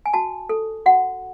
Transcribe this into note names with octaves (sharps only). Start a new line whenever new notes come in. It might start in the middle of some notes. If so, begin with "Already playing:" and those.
G#5
F#4 A5
A4
F#4 F#5